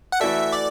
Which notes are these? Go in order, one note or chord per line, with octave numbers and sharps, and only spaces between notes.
F#5
E3 A3 F#4 A4 D5 E5
D5